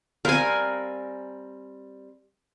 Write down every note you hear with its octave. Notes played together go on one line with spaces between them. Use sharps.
G3 C4 A#4 F5 G#5